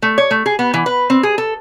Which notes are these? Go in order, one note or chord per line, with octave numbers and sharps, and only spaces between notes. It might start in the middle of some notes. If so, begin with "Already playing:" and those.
A3
C#5
A3
G#4
B3
E3
B4
C4
G#4
A4